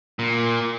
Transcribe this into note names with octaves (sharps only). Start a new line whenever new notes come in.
A#2